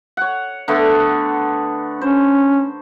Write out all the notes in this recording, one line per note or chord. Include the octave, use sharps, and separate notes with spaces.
C#5 F#5
D3 A3 B3
C#4 C5